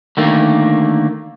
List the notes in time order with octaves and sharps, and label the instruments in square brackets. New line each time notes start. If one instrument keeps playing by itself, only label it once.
[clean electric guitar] D3 D#3 A3 A#3